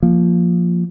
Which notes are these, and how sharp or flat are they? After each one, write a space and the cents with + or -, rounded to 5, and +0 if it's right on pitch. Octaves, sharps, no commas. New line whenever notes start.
F3 +0 A#3 +0